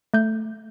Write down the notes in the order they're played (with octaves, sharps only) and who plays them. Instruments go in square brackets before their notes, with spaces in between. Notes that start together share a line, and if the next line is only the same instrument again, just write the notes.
[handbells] A3 G6